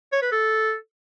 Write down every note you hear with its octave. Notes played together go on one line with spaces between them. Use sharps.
C#5
B4
A4